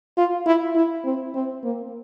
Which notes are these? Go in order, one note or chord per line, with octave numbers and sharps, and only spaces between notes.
F4
E4
E4
C4
C4
A#3